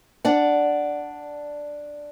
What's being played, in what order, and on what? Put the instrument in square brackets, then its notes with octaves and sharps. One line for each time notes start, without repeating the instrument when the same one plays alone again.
[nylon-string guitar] D4 D5 F#5